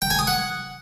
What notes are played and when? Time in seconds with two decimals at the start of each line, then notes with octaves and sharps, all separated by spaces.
0.02 G5
0.10 G#5
0.19 D#6
0.27 F#5